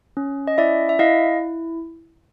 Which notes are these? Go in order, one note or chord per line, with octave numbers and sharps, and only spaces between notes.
C#4
D#5
E4 D5 E5
E5
E4 D#5 F5